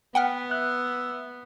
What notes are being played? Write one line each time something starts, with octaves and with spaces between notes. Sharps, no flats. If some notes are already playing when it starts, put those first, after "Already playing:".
B3 B4 F#5 G5 F6
E5 F#6